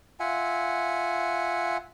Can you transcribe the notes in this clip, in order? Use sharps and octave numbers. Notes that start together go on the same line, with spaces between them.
F4 E5 F#5 G#5